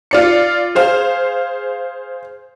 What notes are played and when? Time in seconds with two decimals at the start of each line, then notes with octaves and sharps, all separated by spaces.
0.11 F4 D5 C#7
0.75 G#4 C5 F5